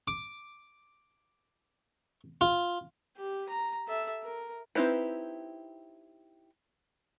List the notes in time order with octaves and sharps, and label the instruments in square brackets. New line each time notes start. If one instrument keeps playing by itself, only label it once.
[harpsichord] D6
F4
[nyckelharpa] G4
A#5
A4 E5
A#4
[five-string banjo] C4 D#4 E4 G4 B4